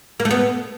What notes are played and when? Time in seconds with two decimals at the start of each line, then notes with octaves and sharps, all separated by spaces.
0.20 A#3
0.25 A3
0.31 B3